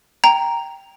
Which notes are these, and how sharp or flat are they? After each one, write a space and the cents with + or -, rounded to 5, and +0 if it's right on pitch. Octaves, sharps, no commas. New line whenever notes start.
G5 +0 A#5 +0